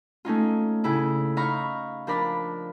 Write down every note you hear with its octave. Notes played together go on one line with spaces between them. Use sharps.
A3 C#4 D#4 F4
A2 C#3 E4
D#4 F5 A#5 B5 C#6
F3 D4 A#4 D5 B5